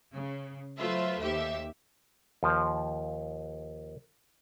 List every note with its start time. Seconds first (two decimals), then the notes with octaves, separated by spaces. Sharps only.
0.14 C#3
0.79 F#3 A3 F4 B4 C5 E5
1.20 D#2 G4 E5
2.43 D#2 F3